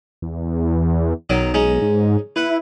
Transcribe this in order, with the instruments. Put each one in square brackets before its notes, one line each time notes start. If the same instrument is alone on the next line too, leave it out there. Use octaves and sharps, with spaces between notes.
[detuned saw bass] E2
[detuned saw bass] B1 [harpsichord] D#3 F#3 D#5
[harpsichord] G#3 C#4 D#4
[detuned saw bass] G#2
[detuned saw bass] E4 [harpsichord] B4 F#5 B5